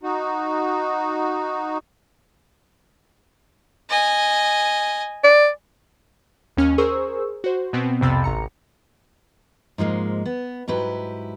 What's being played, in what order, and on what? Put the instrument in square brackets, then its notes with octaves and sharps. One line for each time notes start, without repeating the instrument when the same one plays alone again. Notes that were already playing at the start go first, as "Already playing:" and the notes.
[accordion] D#4 F#4
[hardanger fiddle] D#5 G#5
[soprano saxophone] D5
[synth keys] D#2 C#4 F6
G#4 A#4 C5 C#6 E6
F#4 C5
B2 B3 C4
C2 F2 C3 B5 E6 A6
A1 A#5 C#7
[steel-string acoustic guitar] G#2 F3 G#3 A#3
B3
G#2 F#3 E4 G4 B4